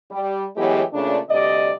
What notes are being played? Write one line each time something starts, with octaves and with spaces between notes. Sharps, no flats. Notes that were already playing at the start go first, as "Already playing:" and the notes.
G3
A2 E3 F#3 G#3 B3 G4
A#2 C#3 A3 D4
D2 C3 G3 D5 D#5